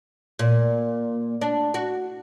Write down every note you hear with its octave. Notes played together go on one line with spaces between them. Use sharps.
A#2
D4
F#4